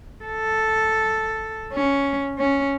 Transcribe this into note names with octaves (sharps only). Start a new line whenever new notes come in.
A4
C#4
C#4